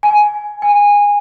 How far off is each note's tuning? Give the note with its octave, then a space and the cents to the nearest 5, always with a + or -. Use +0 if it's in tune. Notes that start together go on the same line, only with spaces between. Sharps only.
G#5 +10
G#5 -20